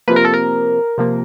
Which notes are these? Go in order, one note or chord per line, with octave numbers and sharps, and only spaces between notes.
C3 F3 A#3 B4
A#4
A4
A#4
C3 F3 A#3